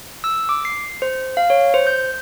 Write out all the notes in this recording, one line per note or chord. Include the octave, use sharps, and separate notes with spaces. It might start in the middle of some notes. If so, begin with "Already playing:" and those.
E6
D6
C7
C5
F5
C#5
C5
G6